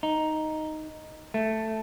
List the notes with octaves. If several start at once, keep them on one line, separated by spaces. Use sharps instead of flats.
D#4
A3